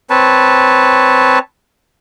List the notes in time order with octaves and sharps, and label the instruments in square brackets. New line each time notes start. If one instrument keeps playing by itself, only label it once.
[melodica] C4 B4 C#5 A5